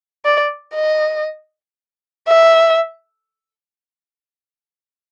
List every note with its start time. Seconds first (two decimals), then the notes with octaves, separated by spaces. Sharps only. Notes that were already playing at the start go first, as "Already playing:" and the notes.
0.25 D5
0.75 D#5
2.28 E5